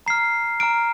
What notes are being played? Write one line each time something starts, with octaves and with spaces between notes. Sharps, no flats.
A#5 F6 C7
A#5 F6 D7